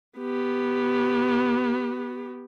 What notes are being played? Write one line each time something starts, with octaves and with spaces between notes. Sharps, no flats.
B3 G4